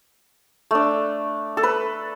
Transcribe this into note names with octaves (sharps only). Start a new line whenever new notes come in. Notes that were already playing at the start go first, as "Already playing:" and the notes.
A3 D4
A4
B4